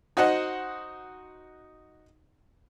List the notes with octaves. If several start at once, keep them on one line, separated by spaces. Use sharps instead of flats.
D#4 F#4 C5 D#5 F#5